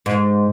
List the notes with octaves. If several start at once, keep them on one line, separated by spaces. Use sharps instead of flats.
G#2